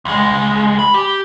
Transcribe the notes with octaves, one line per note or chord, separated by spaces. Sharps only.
C#2 G#3
B5
G4